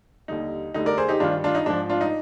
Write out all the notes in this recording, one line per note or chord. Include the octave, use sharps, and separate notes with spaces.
D#2 D3 G3 D#4
D2 D3 G3 D#4
A#4 D5
G#4 C5
D#4 G4
G2 D#3 G3 D4 F4
D4 F4
D#4
G#2 F3 D4
D4 F4
D#4